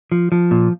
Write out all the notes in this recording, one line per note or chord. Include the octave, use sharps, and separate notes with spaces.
F3
F3
A#2